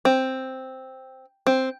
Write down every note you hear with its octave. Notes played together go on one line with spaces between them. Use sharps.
C4
C4